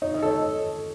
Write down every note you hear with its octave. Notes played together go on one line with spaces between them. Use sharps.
D#4 C#5
D#5
A4 C#5